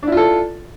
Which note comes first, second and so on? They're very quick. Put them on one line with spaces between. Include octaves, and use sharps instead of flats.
D4 E4 F4 A4